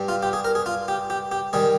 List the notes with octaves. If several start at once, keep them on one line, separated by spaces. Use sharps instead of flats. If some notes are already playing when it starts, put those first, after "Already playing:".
Already playing: G2 G3
F4
G4
G#4
A#4
G#4
F4
G4
G4
G4
D#3 G3 G#4